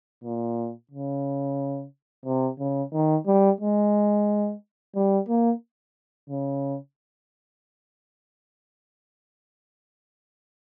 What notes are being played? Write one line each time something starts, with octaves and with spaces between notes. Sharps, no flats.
A#2
C#3
C3
C#3
D#3
G3
G#3
G3
A#3
C#3